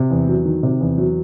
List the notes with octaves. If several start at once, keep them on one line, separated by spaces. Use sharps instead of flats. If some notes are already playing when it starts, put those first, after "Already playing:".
Already playing: C3
E2
F#3
D#3
C3
E2
F#3